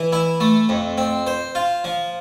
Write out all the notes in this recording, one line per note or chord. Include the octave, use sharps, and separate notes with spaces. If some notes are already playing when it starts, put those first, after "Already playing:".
Already playing: E3
E4
A3
F2
C4
C5
F4
F3